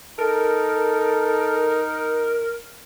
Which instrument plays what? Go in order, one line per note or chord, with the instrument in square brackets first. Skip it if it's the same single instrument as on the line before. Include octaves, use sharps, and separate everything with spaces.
[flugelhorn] D#4 [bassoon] A4 [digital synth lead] A#4